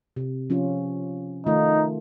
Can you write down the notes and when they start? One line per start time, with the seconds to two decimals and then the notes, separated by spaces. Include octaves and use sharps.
0.16 C3
0.50 F3 C#4 F4
1.47 D#3 A3 D#4 F4